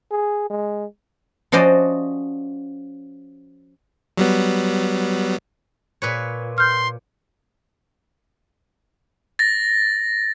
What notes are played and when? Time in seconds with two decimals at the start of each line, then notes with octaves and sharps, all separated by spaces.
0.11 G#4
0.50 G#3
1.52 F3 C#4 F#4 C5 D5 D#5
4.17 F#3 G3 B3
6.02 A#2 B4 C#5
6.58 C6 F6 G6
9.39 A6 A#6